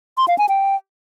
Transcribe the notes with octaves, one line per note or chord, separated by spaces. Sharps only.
C6
F5
G#5
G5